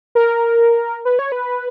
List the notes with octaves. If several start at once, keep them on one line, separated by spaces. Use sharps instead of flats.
A#4
B4
C#5
B4